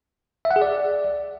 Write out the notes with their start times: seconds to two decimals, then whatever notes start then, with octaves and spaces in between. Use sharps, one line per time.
0.45 E5
0.51 F#5
0.56 G#4
0.62 D5